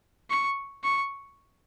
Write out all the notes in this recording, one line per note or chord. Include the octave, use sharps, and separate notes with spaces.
C#6
C#6